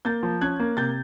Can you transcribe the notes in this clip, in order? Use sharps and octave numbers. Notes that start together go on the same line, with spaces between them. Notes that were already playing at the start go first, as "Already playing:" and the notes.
A#3 G6 A6
F3
C#4 F#6 G#6
A#3
C3 G6 A6